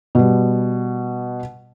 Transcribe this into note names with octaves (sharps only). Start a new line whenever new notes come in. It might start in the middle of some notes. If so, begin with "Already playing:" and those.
B2 G3